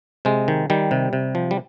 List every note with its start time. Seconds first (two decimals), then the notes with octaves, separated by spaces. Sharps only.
0.25 C3 G#3
0.48 D#3
0.70 D#3 G3
0.91 C3
1.13 C3
1.35 F3
1.51 G3